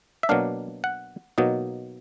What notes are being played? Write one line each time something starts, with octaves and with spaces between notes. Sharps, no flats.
E5
B2 F#3 A#3 D4 F5
F#5
B2 F#3 A#3 D#4